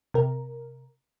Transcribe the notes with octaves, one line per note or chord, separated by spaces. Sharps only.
C3 A#4